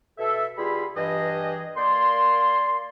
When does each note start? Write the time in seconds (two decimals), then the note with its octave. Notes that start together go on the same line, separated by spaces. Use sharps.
0.18 B2 A4 E5
0.57 B2 G3 F4 G#4 B5
0.96 G2 E3 G#4 D#5
1.77 A#3 D5 C6